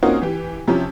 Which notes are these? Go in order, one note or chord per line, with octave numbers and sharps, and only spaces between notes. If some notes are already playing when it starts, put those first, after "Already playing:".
A#3 C4 C#4 D#4 F4 F#4
E3 G4
C3 F3 C#4